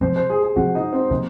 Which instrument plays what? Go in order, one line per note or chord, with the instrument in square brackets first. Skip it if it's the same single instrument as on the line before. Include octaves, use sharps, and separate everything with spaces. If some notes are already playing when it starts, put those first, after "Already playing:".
[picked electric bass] C3 F3 C4 [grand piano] C5
[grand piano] C5
G#4
G#4
[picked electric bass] C3 F3 C4 [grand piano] F#4
[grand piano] D#4
C4
[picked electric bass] C3 F3 C4 [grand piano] A#3